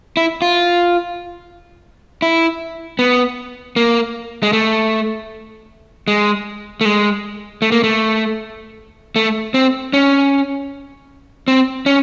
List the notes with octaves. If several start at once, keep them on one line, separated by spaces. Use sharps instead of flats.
E4
F4
E4
B3
A#3
G#3
A3
G#3
A3
G#3
A3
A#3
A3
A3
C4
C#4
C4
C#4